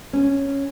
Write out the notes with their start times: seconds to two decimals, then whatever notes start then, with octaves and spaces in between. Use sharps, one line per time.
0.13 C#4